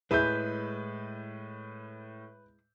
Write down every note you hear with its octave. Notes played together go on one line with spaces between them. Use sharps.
A2 G#3 E4 G#4 B4 G6